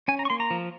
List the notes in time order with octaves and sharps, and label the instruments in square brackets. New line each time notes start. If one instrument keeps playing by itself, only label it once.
[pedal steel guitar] C#4 G#5
A#5
C#6
A#3 C6
A#5
F3